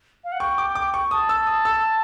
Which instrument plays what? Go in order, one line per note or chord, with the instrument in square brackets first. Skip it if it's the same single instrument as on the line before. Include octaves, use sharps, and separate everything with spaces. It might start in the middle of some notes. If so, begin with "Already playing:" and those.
[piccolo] F5
F#5
[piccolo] G5 [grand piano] C#6
[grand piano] D6
D6
C#6
[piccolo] A5 [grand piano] D#6
[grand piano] E6
D#6
E6